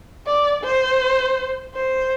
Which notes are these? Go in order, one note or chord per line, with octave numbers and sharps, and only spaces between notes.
D5
C5
C5